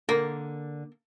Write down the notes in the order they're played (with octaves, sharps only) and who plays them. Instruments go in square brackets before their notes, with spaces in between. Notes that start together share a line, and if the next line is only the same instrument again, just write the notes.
[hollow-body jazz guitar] D3 A#4 D5 [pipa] A#3